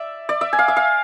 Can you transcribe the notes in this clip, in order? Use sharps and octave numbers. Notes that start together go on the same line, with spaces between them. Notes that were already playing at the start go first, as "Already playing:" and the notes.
Already playing: D5 E5
D5
E5
G#5
F5
E5
F5